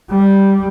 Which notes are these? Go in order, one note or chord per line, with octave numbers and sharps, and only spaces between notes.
G3